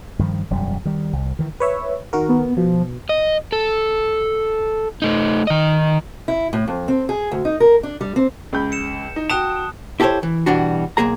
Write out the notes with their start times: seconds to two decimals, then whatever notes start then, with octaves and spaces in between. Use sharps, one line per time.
0.19 G2 D#3 F3
0.50 E1 F#2 G3
0.85 D#3 G3
1.13 C2
1.39 D#3 E3
1.60 B4 C#5 E5
2.13 D#3 F#4 A#4
2.29 B3
2.57 B2 F3
3.09 D#5
3.52 A4
5.02 A3 D#4
5.47 D#3 D#5
6.28 E4
6.53 A2
6.68 F2
6.88 C4
7.09 G#4
7.31 D2
7.45 D#4
7.60 A#4
7.83 D4
8.01 G3
8.16 C4
8.53 C#2 B5 G6
8.72 C#7 E7
9.16 D#4
9.30 F#4 G5 A5 D#6 F#6 E7
10.00 E4 G4 A4 A#4 C5 C#5
10.23 E3
10.46 B2 E3 G3 D4 F#4
10.97 B1 A#2 A#3 G#4 A#5